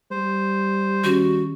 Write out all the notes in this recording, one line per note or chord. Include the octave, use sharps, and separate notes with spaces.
G3 C5
D#3 C#4 F#4